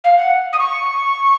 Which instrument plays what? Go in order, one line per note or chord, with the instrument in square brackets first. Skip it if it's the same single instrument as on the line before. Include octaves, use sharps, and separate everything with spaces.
[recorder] F5
F#5
D#6
C#6